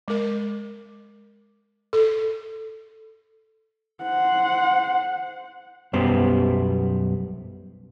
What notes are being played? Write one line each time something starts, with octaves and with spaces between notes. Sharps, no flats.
G#3 A#4
A4
C5 F#5
B1 F#2 G3 B3 C5